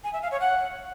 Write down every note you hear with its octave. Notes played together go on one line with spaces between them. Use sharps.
G#5
E5
F5
C#5
F#5